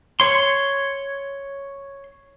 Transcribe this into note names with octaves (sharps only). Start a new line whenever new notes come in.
C#5 C6